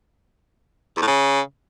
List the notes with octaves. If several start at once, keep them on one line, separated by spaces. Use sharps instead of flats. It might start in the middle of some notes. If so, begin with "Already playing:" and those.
E2
A2
C#3